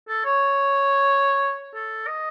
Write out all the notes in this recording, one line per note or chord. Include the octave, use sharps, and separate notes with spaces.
A4
C#5
A4
D#5